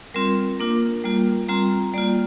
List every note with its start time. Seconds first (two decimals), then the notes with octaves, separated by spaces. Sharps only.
0.14 G3 C4 F4 A#4
0.59 A#3 D4 F4 A#4
1.04 G3 A#3 F4
1.48 G3 C4 F4 A#5
1.94 G3 A#3 F4 D5